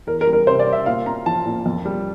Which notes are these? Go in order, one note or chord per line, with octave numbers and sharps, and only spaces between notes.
E2 A#4
A#4
G3
A#4
C3 C5
D5
C4
E5
A#2 F5
C4 A#5
F3 A5
A#2
F2
G3